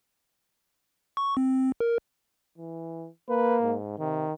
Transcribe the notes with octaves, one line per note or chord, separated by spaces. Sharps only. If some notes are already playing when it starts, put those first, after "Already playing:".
C#6
C4
A#4
E3
A#3 B4
G#2
C3 D#3